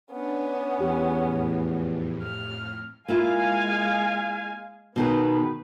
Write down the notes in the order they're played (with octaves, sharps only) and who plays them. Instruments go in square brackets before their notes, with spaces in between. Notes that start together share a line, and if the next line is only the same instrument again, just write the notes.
[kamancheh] B3 C#4 [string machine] D4
[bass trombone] E2 [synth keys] G4
[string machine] F2 A2
[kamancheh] F6
[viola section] G#3 F5 G#5 [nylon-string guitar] A#3 E4 F4
[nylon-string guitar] B2 D#3 G#4 [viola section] B3 B4